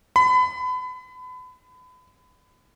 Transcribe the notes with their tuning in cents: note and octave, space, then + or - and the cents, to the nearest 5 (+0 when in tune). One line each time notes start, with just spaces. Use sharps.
B5 +35